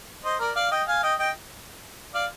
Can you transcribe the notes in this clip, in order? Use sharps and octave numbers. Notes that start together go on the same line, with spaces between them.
C5 D#5
A#4 D5
D5 F5
D#5 G5
F5 G#5
D#5 G5
D#5 G5
D5 F5